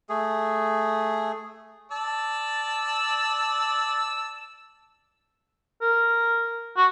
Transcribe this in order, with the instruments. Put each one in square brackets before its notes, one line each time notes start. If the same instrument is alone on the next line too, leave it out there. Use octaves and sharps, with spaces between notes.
[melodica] A3 G#4
[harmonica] D5 A5 E6
[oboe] A#4
F#4